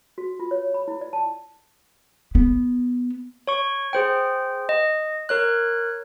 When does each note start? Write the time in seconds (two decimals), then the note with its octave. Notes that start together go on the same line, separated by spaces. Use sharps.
0.18 F#4
0.39 F4
0.51 C#5
0.74 B5
0.88 E4
1.01 D5
1.13 A5
2.35 B3
3.47 C#5 C#6
3.93 G#4 C5 G5
4.69 D#5
5.29 A#4 C#5 F#6